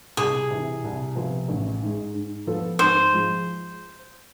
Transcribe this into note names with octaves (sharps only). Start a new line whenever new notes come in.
C2 G#4
C3 E3
C2
C3 F3 B3 F4
A1
G#2 G#3
G#2
F3 B3 F4 A4
G#2 C5
F3 G#3